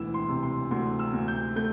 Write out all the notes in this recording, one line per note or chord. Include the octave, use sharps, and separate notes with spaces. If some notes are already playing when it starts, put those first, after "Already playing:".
Already playing: E1 D2 E3 E6
C6
C3
C6
D2 C6
E6
D2
G6
A3 G6